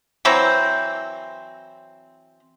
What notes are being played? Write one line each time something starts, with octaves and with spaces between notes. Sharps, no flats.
E3 F#3 C4 A#5